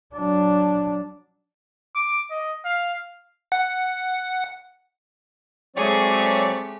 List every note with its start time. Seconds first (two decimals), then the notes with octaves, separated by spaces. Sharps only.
0.15 F#3 D4
1.95 D6
2.31 D#5
2.65 F5
3.52 F#5
5.76 F#3 G#3 A3 C4 G4 G#4 D5 C#6